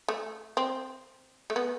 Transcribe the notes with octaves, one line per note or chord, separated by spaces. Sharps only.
A3
C4
A3
B3